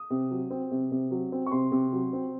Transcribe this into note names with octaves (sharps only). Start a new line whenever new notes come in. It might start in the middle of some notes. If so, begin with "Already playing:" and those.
Already playing: D#6
C3
F#3
C4
C3
C3
F#3
C4
C#6
C3 C6
C3
F#3
C4